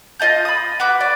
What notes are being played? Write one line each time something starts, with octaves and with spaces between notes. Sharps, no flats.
F4 D#5 A5 G6
B5 D#6
F#4 B4 D6
D5